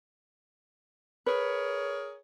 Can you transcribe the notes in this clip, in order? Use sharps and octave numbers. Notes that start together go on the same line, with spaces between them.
G#4 A#4 B4 C#5